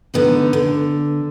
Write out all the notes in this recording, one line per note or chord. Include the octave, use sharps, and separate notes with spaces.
D3 B3 D#4
D3